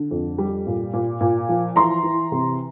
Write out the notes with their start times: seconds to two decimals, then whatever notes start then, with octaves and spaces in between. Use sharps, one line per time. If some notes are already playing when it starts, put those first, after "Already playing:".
Already playing: D3
0.11 F2
0.38 G3
0.67 A#2
0.93 A#2
1.21 A#2
1.49 F3
1.76 E3 A#5 C6
2.03 E3
2.32 C3